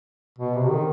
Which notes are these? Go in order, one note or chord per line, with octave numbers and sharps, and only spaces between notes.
B2
C3
D#3